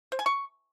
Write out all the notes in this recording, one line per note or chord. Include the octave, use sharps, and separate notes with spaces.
C5
G#5
C#6